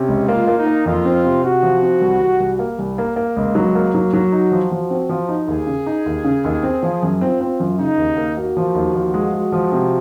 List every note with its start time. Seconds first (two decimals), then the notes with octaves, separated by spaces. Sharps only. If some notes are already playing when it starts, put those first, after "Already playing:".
Already playing: C3 C#4
0.08 C#2
0.28 A#3 F4
0.47 A#3
0.57 D#4
0.66 A#3
0.86 F2 F4
1.05 C4
1.24 C3
1.44 C3 F#4
1.63 F3
1.82 C4
2.01 C2
2.20 C2
2.39 C2
2.59 A#3
2.78 C2
2.98 A#3
3.16 A#3
3.36 C#2
3.55 F#3
3.75 A#3
3.94 F#3
4.13 F#3
4.32 D#4 F#4
4.52 F3
4.71 F3
4.90 C4
5.09 F3
5.29 D#4
5.48 D#2 G#4
5.67 C#3
5.86 D#4
6.06 D#2
6.24 C#3
6.44 D#2
6.63 C4
6.83 F3
7.03 F#2
7.21 C4 F4
7.41 C4
7.60 F#2
7.78 C#3 D#4
7.98 D#2
8.17 A#3
8.37 A#3 F#4
8.57 F3
8.75 D#2
8.94 F3
9.14 G#3
9.33 G#3
9.52 F3
9.72 C3